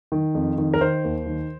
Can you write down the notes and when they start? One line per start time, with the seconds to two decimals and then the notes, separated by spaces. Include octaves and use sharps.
0.12 D#3
0.35 F2
0.58 D#3
0.74 A#4
0.81 D#3 C5
1.04 D#2
1.26 D#3